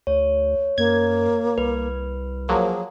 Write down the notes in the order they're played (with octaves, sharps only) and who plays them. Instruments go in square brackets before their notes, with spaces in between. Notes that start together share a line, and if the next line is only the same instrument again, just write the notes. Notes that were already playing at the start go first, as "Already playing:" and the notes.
[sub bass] D2 [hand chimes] C#5
[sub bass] F#2 [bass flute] A#3 [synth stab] G#6
[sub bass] C2 [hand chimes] B4
[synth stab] F3 F#3 A#3 [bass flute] G#4